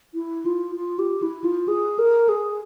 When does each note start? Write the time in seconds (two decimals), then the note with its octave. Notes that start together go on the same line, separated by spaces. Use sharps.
0.14 E4
0.45 F4
0.75 F4
0.99 G4
1.22 E4
1.44 F4
1.68 G#4
1.99 A#4
2.29 G#4